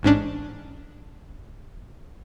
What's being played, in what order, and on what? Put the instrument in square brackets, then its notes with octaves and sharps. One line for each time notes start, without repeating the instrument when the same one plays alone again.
[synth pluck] A1 G#2 C#4 D4